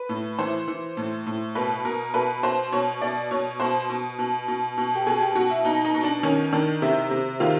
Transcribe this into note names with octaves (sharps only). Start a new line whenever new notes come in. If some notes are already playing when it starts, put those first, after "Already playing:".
Already playing: B4
A2
E3 C5
E3
A2
A2
B2 B4
B2 A#4
B2 B4
B2 C5
B2 C#5
B2 D5
B2 C#5
B2 C5
B2
B2
B2
B2
G4
B2 G#4
G4
B2 F#4
E4
B2 D#4
D#4
B2
D4
D#3 C#4
D#3 D4
C3 E4
C3
D#3 F4